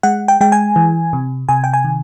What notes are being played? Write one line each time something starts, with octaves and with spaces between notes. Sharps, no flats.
G#3 F#5
G5
G#3 G5
G#5
E3
C3
C3 G#5
G5
G#5
D#3